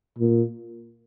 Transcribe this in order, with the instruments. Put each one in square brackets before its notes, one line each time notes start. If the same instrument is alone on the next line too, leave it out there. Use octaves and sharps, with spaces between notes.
[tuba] A#2